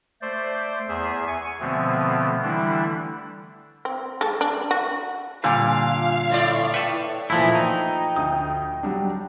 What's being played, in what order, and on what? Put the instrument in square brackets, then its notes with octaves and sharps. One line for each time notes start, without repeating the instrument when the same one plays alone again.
[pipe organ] A3 C5 D5
E2 G#4 E5
G#5 C#6
B2 D3 F3 A3 B3 C4
D3 E3 G3 A3 D4 E4
[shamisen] C4
G#3 A4
D4
F#4
[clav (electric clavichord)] A#2 D3 G3 [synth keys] F4 G#5 D6 [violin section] F5
[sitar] A2 E4 D5
[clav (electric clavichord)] A4 B4 [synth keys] G5 C#6
[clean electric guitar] A#2 E3 E4 [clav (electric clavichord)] F3 A3
[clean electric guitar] D#4 [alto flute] G5
[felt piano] D2 D#6 G6
F#3 G3 D4